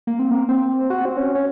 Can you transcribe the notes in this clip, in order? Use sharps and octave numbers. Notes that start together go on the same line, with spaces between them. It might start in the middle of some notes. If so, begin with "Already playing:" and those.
A#3
C4
A#3
C4
F#4
C4
C#4
C#4